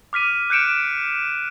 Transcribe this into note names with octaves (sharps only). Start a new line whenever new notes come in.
D6 F6 B6 D#7
F#6 G6 C#7 D7 E7